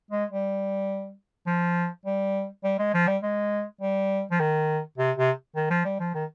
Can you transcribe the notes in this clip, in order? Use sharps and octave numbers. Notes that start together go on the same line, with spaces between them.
G#3
G3
F3
G3
G3
G#3
F3
G3
G#3
G3
F3
D#3
C3
C3
D#3
F3
G3
F3
D#3